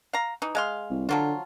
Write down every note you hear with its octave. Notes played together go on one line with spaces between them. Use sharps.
F5 A#5
E3 D#4
G#3 F5 C6
C2
D3 F3 F#3 F4